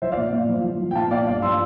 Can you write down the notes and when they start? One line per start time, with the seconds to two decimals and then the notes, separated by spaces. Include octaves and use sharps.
0.02 F3 C5 E5
0.12 D5 F5
0.18 A#2
0.33 A#2
0.49 F3
0.64 F3
0.80 F3
0.91 G5
0.95 A#2 F5 A5
1.11 A#2 D5 F5
1.27 G2 D5 F5
1.42 F3 C6 E6